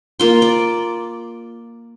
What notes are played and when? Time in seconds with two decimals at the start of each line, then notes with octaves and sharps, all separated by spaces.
0.20 A#3 F4 C6
0.42 D5